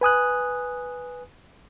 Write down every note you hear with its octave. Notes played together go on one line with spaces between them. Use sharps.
B4 G#5 D#6 F#6